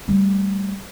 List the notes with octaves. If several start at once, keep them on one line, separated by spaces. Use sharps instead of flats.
G3 A3